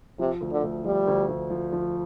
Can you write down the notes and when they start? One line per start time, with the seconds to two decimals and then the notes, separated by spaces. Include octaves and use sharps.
0.19 C3 F3
0.41 D2
0.52 D3
0.63 D2
0.84 F3 G3
1.07 D2
1.29 D2
1.50 F3
1.72 F3